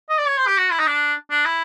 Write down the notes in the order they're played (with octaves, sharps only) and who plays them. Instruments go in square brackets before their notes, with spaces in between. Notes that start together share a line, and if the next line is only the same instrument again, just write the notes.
[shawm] D#5
D5
C#5
C5
G4
F#4
E4
D#4
D4
D4
E4